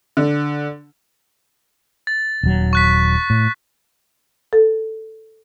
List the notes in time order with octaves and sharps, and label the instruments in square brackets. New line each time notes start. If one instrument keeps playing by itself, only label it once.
[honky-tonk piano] D3
[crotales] A6
[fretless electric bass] D#1 F#3
[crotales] C#6 F#6 B6
[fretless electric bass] A2
[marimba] A4